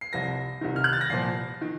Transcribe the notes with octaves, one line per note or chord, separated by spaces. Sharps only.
C7
C2 C3 F3 A#6
C2 C3 D#3
F6
F#6
A6
A#6
C2 A#2 F3 C7
D#3